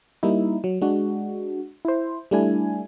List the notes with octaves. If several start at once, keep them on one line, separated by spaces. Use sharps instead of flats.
G3 A#3 D#4 E4
F#3
G#3 D4 F#4
E4 C5
G3 A3 D4 E4 G#5